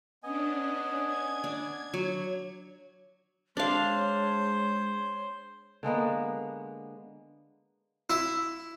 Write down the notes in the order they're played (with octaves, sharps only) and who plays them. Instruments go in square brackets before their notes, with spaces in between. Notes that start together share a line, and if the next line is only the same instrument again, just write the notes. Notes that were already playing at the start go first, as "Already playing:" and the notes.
[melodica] B3 D#5 G#5 [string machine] C#4 D4
[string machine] G#6
[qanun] D4
F#3
[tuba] G#3 [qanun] D4 F5 [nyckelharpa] C5 [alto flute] C#5
[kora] D3 G#3 A#3 B3
[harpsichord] E4